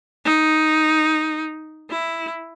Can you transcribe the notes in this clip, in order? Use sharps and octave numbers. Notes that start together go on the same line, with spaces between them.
D#4
E4